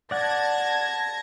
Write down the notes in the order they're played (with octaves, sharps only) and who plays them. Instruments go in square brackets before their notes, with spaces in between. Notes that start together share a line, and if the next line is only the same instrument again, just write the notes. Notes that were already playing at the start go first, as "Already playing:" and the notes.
[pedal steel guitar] D5 F#5 [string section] A5 G#6 A#6